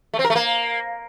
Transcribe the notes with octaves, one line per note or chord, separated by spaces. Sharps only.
A3
C4
A#4
A3
A#3